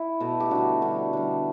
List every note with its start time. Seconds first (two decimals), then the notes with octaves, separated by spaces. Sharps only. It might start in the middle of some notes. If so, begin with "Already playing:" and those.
Already playing: E4
0.20 B2 A3
0.40 G4
0.51 D3 G3 F#4
0.82 D3 G3
1.13 D3 G3